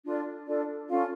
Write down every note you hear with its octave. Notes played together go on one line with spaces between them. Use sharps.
D4 F4 A4 D5
D4 F4 A4 D5
C#4 F4 A4 F5